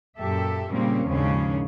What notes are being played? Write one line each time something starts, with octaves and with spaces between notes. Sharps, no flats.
F#2 A#2 G4 A4 E5
A#2 C#3 G3 A#3 C4 C#4
D#2 G#2 C#3 F3 C#4 D4